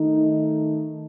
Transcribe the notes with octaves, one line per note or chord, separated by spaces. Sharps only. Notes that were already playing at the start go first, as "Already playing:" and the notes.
Already playing: D#3 A3 D#4